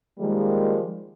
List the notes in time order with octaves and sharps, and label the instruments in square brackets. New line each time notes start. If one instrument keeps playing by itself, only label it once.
[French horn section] D#3 F3 G3 G#3 A#3